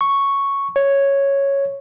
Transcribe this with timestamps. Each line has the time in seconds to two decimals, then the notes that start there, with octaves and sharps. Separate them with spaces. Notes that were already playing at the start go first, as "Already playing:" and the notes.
0.01 C#6
0.76 C#5